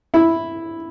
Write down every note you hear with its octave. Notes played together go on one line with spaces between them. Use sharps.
E4